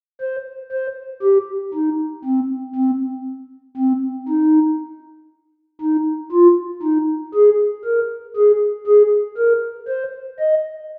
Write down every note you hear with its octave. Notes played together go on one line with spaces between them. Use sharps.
C5
C5
G4
D#4
C4
C4
C4
D#4
D#4
F4
D#4
G#4
A#4
G#4
G#4
A#4
C5
D#5